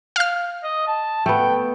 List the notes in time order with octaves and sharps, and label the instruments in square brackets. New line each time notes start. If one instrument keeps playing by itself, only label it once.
[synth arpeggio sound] F5 F6
[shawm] D#5
A5
[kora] A3 B3 [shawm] G5